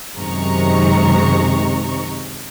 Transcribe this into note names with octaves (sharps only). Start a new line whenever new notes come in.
F#2 C3 D#3 G#3 A#5 C#6